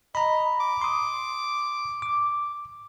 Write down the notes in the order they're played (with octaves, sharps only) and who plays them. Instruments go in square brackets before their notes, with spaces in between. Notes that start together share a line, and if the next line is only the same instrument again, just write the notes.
[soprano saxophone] D#5 [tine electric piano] A#5 B5
[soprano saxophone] D6
[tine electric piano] C6 D#6
D6